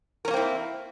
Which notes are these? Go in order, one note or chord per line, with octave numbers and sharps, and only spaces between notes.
A#3 C4 C#4 E4 A#4